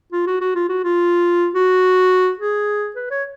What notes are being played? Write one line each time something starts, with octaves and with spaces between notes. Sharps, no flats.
F4
F#4
F#4
F4
F#4
F4
F#4
G#4
B4
C#5